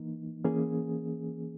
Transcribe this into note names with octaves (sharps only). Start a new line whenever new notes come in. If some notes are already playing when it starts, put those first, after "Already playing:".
Already playing: E3 A#3 D#4
E3 A#3 C#4 G#4